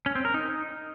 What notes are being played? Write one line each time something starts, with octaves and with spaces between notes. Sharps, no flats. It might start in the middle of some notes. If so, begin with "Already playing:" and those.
C#4
C4
A#4
D#4